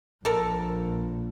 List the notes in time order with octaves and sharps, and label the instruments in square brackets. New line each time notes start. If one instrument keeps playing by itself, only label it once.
[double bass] A#1 A#2 [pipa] A4 A#4